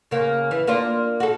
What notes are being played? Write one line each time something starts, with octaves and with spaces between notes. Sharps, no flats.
C#3 A#3
E3
A#3 D4 F4
F#4 A4